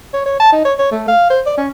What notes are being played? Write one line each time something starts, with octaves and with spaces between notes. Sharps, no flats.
C#5
C#5
A5
D#4
C#5
C#5
A3
F5
C5
D5
C#4